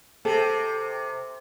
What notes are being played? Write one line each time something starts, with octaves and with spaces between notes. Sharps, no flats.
C3 A4